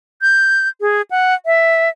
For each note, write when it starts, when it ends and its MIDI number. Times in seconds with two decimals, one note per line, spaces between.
0.22 0.68 91
0.81 1.02 68
1.11 1.34 78
1.46 1.89 76